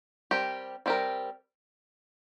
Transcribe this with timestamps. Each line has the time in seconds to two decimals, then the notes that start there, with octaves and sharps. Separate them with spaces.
0.31 G3 C4 G4 A#4
0.86 G3 C4 G4 A#4